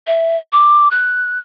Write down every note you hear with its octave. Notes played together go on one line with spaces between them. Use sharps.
E5
D6
F#6